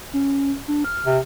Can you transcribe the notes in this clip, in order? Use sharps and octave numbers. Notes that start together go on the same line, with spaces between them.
C#4
D4
F6
C3